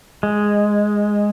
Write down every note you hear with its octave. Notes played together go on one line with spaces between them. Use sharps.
G#3